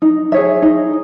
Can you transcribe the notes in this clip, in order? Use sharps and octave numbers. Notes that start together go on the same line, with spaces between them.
D#4
G#4 C#5 E5
D#4